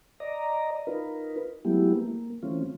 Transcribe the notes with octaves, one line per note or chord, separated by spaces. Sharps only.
D5 D#5 A#5
D#4 F4 A#4 B4
F#3 G#3 A3 B3 E4 G4
A#3
E3 A3 C4 C#4 F4